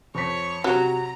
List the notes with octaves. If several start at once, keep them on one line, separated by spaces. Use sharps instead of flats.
F2 C5 C#5 B6
C3 F#3 F#4 A#5